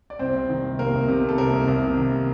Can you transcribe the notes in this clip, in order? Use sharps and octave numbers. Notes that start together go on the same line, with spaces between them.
D5
C2 C4 C5
C2
D#3
C2
C3 A#3 A#4
C2
C3
C3
A4
C2 A#3 A#4
C2
C2
C3
D#3
C3